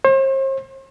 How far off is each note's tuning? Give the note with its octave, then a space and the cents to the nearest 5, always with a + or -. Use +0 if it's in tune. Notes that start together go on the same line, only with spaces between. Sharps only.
C5 +45